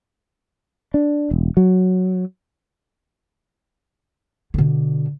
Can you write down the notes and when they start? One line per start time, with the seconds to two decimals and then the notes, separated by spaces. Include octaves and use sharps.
0.94 D4
1.31 E1
1.57 F#3
4.54 B2 D3